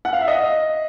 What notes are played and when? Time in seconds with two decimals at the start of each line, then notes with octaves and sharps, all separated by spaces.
0.05 F#5
0.13 F5
0.21 E5
0.28 D#5